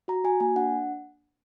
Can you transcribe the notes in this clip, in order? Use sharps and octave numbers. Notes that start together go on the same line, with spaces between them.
F#4 A#5
F#4 G#5
A#3 G#5
D4 F#5